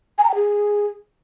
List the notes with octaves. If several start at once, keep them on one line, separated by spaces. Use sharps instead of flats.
G#5
A#5
G5
G#4